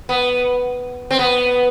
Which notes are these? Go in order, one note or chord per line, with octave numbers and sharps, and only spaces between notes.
B3
C4
B3